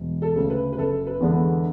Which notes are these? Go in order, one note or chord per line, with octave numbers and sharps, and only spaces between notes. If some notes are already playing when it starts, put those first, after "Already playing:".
Already playing: E1
A4
D2 C#3
B4
B4
F#1 A4
B4
E2 D3 G#3 B3